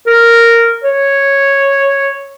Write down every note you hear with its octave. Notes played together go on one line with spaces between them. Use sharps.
A#4
C#5